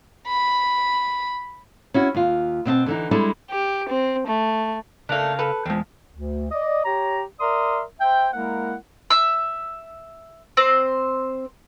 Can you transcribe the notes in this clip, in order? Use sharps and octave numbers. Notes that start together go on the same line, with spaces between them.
B5
C#4 E4 F#4
D#2 F4
B2 C4 D#5 A5
D3 E3 D#4
G3 G#3 D4 E4 A4
G4
C4
A3
C#3 A3 D4 A#4 F5
A4 B4
E2 F3 G#3 C4
D2
D5 D#5
G4 C#5 A#5
A#4 D5 E5 C6 D#6
C5 E5 G5
G#3 A#3 E4 A#4 F#5
E5 E6
C4 C5